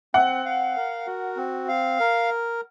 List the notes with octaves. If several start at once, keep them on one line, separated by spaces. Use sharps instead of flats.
C4 F#5
F5
A#4
F#4
C4
F5
A#4